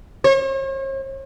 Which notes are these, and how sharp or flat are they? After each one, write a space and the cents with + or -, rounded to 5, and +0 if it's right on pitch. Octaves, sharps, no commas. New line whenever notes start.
C#5 -45